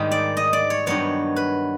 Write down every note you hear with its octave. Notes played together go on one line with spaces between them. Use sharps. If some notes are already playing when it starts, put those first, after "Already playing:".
Already playing: G#2 D#3 G3
D5
D#5
D5
C#5
G2 D#3 F#3 B3 C#5
B4